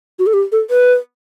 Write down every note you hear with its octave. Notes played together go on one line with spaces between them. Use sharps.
F#4
A4
G4
A4
B4